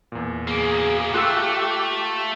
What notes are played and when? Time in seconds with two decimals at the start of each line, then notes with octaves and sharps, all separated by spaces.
0.12 E2 A#2
0.48 F#2 A#3 G#4
1.14 A3 F4 G4 A4 E6 F#6